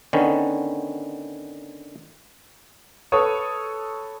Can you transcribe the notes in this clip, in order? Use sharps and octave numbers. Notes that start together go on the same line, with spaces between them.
D3 D#3 B3 C#4
A4 B4 C#5 C#6 D#6